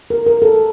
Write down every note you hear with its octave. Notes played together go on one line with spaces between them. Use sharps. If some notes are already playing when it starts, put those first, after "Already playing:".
A#4
A#4
A4